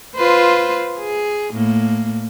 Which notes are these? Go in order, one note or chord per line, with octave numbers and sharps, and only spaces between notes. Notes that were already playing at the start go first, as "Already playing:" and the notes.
F4 B4 C5
G#4
A2 A#3